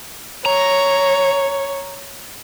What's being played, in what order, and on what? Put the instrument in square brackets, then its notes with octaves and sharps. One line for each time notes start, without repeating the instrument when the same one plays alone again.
[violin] C#5 [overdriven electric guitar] A#5